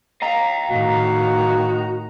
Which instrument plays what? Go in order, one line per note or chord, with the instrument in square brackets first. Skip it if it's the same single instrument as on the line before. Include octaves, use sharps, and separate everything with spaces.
[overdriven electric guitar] D#5 F5 [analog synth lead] A#5
[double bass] A2 D#3 [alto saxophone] F#4